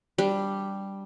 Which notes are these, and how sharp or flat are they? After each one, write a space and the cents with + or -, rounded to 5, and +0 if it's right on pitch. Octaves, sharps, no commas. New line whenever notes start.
G3 +0 D4 +0